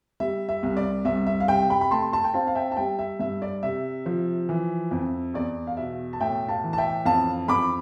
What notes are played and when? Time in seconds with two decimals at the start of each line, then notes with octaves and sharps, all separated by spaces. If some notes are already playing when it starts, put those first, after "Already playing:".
0.20 G3 E5
0.49 E5
0.63 C2
0.77 D5
1.05 C2 E5
1.27 E5
1.40 F5
1.48 C3 E5 G5
1.70 G5 B5
1.81 B5
1.91 A3 A5 C6
2.13 A5 C6
2.24 G5
2.34 C4 F5 A5
2.47 F5
2.55 E5 G5
2.72 A5
2.77 G3 E5 G5
2.99 E5
3.19 G2 E5
3.42 D5
3.63 C3 E5
4.06 F3
4.49 E3
4.91 F2
5.34 E2 D5
5.67 F5
5.77 B2 E5
6.13 A5
6.20 A2 E5 G5
6.48 F5 A5
6.64 E3
6.73 A5
6.78 E5 G5
7.06 F2 F5 A5
7.48 F2 B5 D6